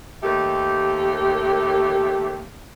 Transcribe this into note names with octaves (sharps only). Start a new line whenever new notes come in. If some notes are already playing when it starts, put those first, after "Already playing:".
D#2 A3 G4